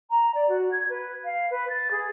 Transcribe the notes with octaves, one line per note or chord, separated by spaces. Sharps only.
A#5
D5
F#4
G#6
B4
F5
B4
A6
G#4